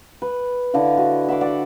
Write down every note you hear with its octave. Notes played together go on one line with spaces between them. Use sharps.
B4
D3 E4 D#5 F5
F#4
E5 F#5 C6 D6
D5 F#5